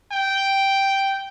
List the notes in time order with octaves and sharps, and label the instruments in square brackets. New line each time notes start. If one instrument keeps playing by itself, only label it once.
[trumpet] G5